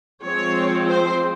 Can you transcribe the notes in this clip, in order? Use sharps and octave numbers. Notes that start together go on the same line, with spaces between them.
F3 G#3 C4 C#5
C5